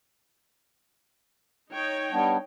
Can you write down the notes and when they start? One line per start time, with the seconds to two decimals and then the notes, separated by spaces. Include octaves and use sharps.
1.72 D#4 C#5 G5
2.12 G3 B3 D4